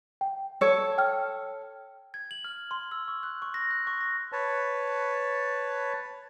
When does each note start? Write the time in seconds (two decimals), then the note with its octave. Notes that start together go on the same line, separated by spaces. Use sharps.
0.21 G5
0.61 A4 C#5
0.98 G5 F6
2.14 G#6
2.31 F#7
2.44 F6
2.71 C6
2.91 E6
3.08 C#6
3.23 F#6
3.42 C#6
3.54 A#6
3.71 F#6
3.87 C#6
4.01 A#6
4.32 B4 C#5 A5